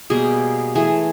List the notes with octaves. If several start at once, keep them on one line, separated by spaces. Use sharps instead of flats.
B2 G3 A#3 G#4
E3 A3 G#4